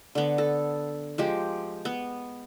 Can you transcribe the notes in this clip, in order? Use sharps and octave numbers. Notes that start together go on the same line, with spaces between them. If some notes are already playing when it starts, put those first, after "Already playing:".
D3 B3
A4
F3 G#3 G4
B3